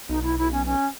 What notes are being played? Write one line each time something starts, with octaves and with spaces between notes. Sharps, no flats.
B1 D#4
E4
E4
C#4
C#4